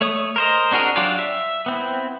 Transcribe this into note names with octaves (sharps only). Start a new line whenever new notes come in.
A3 C#5 D#6
A#4 C5 D#5
C4 D4 F#4 G#4 A#4
F#3 D4 F4 G4 D5
E5
B3 C4 E4